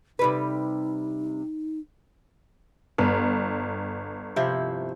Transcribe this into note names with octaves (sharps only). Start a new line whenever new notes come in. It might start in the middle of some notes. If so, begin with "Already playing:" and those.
C3 G3 D#4 B4
G1 B4
C3 F3 E4